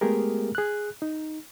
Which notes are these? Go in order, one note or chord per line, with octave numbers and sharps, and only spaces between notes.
G#3 A3 B3 G4 G#4 A#4
G#4 F#6
D#4